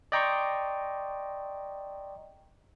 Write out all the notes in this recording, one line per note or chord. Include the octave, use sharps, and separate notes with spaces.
D5 D#5 G5 A#5 C6 C#6